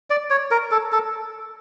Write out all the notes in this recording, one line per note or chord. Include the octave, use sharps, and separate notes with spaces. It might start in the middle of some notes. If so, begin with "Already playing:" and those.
D5
C#5
A#4
A4
A4